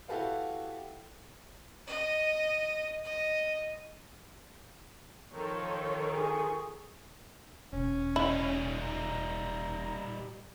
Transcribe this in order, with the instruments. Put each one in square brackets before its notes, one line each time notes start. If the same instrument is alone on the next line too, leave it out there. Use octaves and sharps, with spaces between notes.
[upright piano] E4 F#4 G4 A4 B4 F5
[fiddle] D#5
D#5
[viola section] D#3 F3 A4 [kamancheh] C#5
[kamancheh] G#4 C#6
[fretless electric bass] E1 [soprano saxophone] C#4
[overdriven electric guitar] G3 D#4 [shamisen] E4
[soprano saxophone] A#5